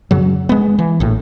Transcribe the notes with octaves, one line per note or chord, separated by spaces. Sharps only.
F#2 C#3 F#3
G#3 B3
E3
A#1 A2